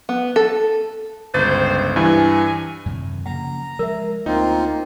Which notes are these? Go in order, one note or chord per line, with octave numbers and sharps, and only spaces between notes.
B3
A4
G1 C#2 C5 A6
G2 E3 G#5
F#2 C3 D#3
C#3 F3 A#3 F#5 A#5
F3 G#3 A#4 E5
D2 A#3 C4 D#4 F4